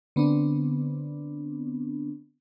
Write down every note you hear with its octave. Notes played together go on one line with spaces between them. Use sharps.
D3 B3 C4 D4